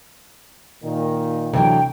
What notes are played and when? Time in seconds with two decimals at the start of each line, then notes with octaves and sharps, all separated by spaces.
0.83 A#2 D#3
1.53 D2 C3 E3 F#3 G5